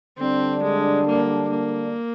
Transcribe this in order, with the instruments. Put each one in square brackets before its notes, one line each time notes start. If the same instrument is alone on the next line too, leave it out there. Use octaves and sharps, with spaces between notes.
[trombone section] D3 G3 D4 [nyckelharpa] C4
[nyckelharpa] G#3
A#3
A#3